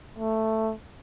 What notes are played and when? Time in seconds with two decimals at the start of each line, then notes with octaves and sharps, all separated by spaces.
0.18 A3